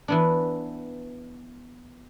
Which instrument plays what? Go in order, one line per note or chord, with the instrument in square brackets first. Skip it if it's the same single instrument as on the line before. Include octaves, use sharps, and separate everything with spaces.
[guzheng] E3 B3 D4